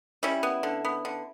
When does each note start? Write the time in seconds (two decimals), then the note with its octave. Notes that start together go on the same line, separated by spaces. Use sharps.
0.23 G3 C#4 E4
0.43 B3
0.63 D3
0.85 B3
1.05 D3